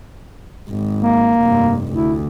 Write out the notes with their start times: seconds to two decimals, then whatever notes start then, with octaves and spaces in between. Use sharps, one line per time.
0.69 G#1
1.00 A#3
1.42 F1 G2
1.94 D2 E4